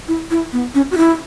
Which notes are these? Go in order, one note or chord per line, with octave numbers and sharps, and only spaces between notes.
E4
E4
B3
C#4
F#4
E4